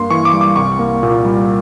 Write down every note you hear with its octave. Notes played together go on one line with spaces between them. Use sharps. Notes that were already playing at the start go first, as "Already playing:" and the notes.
Already playing: G2 A#3 C6
E3 C#6
D6
G3
D6
C2 C#6
A#3
A#2
G3